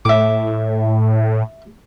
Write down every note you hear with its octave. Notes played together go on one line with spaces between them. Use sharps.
A2 E5 D6